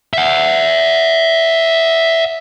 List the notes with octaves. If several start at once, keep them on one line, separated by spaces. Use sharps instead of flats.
E5 F#5